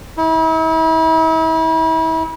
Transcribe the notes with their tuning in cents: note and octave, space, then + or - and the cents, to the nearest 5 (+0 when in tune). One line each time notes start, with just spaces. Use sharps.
E4 -40